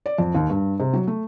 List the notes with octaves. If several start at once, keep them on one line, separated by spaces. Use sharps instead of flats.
D5
F2
D#2
G2
C3
F#3
A3